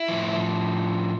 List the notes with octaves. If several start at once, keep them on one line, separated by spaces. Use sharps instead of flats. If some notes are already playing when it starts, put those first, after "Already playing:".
Already playing: E4
A2 F3